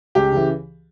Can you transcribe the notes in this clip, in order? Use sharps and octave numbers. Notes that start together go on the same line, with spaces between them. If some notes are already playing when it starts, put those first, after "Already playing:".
C#2 G4
C#3 E3